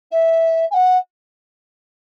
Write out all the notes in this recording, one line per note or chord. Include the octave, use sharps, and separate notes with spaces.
E5
G#5
F#5